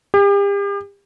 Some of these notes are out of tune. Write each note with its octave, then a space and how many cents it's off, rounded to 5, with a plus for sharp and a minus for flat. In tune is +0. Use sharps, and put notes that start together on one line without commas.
G4 +40